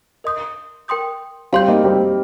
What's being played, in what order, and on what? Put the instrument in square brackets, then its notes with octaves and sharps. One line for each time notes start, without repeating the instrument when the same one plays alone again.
[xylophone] A#4 D#5 C6 D#6 G6
A#4 G5 C6 D#6 G6
[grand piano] G3 C4 [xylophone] F5 C6 G6
[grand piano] A#3 D#4
G3 C4